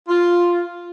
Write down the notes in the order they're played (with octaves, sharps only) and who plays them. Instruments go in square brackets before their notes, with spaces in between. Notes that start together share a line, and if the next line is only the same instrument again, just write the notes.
[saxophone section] F4